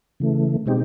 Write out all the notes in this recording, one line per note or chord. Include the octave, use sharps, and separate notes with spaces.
C#3 E3 A3
B2 G#3 C4 D#4 G4